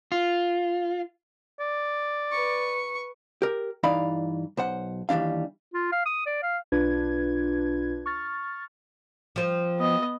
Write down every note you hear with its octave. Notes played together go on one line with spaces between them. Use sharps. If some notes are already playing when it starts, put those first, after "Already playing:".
F4
D5
B4 C#6
G4 A#4
G2 E3 D#4 D5 F5 B5
B1 C5 F#5
D#2 E3 G3 D4 F5
F4
F5
D#6
D5
F5
B1 D4 F4 B4 G#6
C#6 F6 A6
F3 C4
B3 D#5